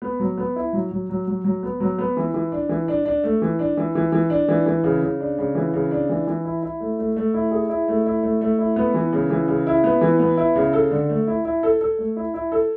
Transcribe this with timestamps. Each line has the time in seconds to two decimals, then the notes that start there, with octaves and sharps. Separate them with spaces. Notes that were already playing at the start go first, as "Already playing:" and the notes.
0.02 B3
0.20 F#3
0.38 B3
0.56 E4
0.73 F#3
0.91 F#3
1.10 F#3
1.27 F#3
1.44 F#3
1.63 B3
1.80 F#3
1.99 B3
2.17 E3
2.34 E3
2.52 D4
2.69 E3
2.88 D4
3.05 D4
3.24 A3
3.42 E3
3.59 D4
3.77 E3
3.95 E3
4.12 E3
4.30 D4
4.48 E3
4.66 E3
4.84 C#3
5.02 C#3
5.20 D4
5.38 C#3
5.55 E3
5.73 C#3
5.91 D4
6.09 E3
6.27 E3
6.45 E4
6.62 E4
6.80 A3
6.99 A3
7.16 A3
7.34 E4
7.51 G#4
7.69 E4
7.88 A3
8.06 E4
8.23 A3
8.41 A3
8.58 E4
8.76 B3
8.94 E3
9.13 C#3
9.30 E3
9.48 C#3
9.67 E4
9.84 B3
10.01 E3
10.19 B3
10.37 E4
10.56 C#3
10.73 A4
10.91 D3
11.09 A3
11.27 E4
11.45 E4
11.63 A4
11.81 A4
11.98 A3
12.16 E4
12.34 E4
12.52 A4